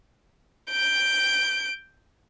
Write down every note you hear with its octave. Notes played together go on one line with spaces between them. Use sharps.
G6 D7